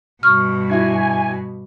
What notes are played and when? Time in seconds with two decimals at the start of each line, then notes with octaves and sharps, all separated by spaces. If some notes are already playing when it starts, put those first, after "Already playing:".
0.23 G2 B2 C#6 F6
0.70 D4 E4 F#4 G#5